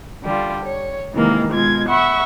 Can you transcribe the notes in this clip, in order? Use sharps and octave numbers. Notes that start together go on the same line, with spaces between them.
D3 G3 F4
C#5
C3 D#3 E3 G#3 A#3
B2 G#3 F4 G#6
E5 F#5 B5 C#6